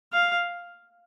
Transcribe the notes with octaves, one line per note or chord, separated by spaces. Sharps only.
F5